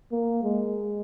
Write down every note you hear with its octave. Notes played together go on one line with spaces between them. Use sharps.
A#3
G#3